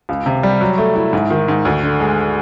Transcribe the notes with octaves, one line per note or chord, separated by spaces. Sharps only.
C#2
C3
G3
F#3
A3
E4
G#2
D#3
G#2
D2
D3
G#3